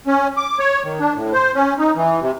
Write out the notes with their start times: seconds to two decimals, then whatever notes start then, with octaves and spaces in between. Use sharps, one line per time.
0.07 C#4
0.37 D6
0.59 C#5
0.85 D#3
0.99 D4
1.15 A2
1.33 C5
1.55 C#4
1.79 D#4
1.96 E3
2.21 C3